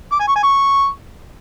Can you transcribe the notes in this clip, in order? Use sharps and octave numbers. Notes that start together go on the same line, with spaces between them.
D6
G#5
C#6
G#5
C#6